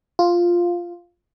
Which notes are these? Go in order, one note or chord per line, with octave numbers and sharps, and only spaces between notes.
F4